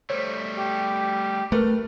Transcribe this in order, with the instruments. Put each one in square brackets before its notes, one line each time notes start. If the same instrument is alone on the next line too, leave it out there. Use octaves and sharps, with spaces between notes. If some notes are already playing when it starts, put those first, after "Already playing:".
[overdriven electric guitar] G3 A3 [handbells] C5 C#5
[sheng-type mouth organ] G4
[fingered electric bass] A3 [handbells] A#4 B4 [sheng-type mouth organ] F6